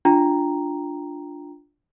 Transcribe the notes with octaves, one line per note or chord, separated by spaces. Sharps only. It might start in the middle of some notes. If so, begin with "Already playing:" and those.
D4 F4 G5 A#5